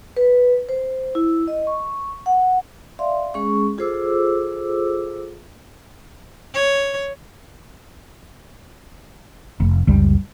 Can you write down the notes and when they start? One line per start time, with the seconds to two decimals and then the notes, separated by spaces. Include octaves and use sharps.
0.17 B4
0.69 C5
1.15 E4
1.48 D#5
1.67 C#6
2.26 F#5
2.99 D5 E5 F5 C6
3.34 G#3 C#4 G#4 C#6
3.78 F4 G#4 A4 C5 D6 E6
6.54 C#5
9.60 F1
9.87 F#1 C#2 G3